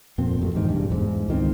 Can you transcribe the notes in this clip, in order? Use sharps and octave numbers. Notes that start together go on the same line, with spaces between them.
F2 A#2 C4
A1 F2
E2 G#2 D#3
E1 G2
E2 G#2
C#2 D#3 C4